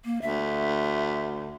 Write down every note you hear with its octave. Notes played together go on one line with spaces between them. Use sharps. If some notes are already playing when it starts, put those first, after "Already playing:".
A#3
D2 E5